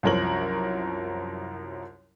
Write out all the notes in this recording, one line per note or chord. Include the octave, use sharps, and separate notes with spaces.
C2 F#2 F3 A#4 C#5 F#7